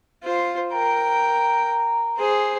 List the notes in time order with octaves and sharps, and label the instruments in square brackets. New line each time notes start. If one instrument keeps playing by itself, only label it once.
[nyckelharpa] F4 C5
[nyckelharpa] A#4 G5 [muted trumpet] A#5
[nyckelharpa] G#4 C5